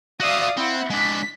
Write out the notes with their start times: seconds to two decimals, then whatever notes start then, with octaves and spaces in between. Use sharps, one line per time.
0.20 F#4 D5 E5 F5 D#6
0.57 C4 E4 F#5
0.90 G#3 D4 B6